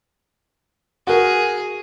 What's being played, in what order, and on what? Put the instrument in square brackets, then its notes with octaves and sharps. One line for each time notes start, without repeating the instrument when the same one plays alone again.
[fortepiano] F#4 A#4 [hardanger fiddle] G#4